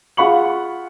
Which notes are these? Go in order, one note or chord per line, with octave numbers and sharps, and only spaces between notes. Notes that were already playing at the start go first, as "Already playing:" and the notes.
F4 G#4 F#5 B5 C#6 F#7